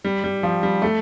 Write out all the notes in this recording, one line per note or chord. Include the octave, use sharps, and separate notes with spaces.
G3
G3
F3
G3
A3